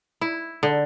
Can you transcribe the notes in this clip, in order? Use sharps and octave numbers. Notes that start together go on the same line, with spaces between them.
E4
D3